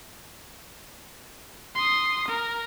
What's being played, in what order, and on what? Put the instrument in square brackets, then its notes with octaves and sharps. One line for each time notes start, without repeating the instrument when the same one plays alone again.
[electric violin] C6 D#6
A#4